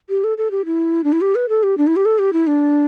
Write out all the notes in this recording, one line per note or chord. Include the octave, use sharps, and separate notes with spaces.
G4
A4
A4
G4
E4
D4
E4
G4
B4
A4
G4
D4
E4
G4
A4
G4
E4
D4